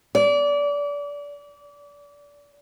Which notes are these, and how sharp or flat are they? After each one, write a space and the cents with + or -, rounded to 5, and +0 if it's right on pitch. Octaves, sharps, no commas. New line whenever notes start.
D5 -30